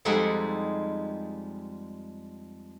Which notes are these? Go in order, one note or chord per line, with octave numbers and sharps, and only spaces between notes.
F2 G3 G#3 D#4 E4 F#5